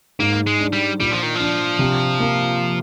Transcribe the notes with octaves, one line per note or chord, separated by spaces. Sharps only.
G#2 A#3
G#3
D4
G3
A#2 G3
F3
D#3
F3 D4
C3
A#3